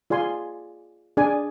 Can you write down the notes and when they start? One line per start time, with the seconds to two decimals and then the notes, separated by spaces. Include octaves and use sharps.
0.10 F4 G#4 D5 G#5 C6
1.17 D4 G#4 D5 G#5